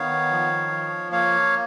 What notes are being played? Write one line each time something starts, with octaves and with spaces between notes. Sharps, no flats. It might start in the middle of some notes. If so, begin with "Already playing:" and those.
Already playing: D#3 B3 C#5 F5
F3
F3
A#3 C#5 F5